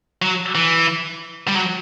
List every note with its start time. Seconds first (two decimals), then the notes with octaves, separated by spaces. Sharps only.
0.22 F#3
0.55 E3
1.48 G3
1.56 F#3